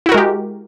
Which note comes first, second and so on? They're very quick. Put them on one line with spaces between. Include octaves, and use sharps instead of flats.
E4 F#4 A#4 G#3 G4